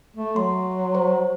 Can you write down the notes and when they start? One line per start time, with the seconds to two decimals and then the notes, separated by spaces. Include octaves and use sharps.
0.16 A3
0.36 F#3 C6
0.95 C5